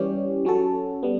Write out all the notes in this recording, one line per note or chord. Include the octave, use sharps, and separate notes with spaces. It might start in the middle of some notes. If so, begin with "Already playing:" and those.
Already playing: E3 G3 C#4 G4
F#3 C#4 F#4 A4
G3 B3